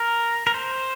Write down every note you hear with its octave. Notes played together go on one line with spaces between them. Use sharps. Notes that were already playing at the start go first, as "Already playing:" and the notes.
Already playing: A#4
A#4
C5